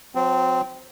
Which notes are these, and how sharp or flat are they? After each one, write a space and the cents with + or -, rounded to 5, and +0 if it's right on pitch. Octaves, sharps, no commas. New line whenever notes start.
F#3 -45 C4 -15